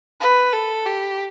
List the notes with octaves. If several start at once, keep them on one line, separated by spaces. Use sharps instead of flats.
B4
A4
G4